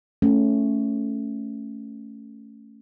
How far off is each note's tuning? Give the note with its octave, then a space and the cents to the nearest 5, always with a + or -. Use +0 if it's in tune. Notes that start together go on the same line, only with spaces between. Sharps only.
A3 +0 C#4 +0